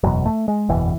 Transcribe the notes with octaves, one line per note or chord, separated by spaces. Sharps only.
F#1 E2 B2 F#3
A3
G#3
F#1 E2 B2 E3